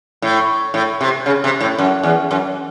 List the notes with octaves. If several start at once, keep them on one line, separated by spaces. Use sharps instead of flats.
A2
A2
C3
C#3
C3
A2
F#2
E2
F#2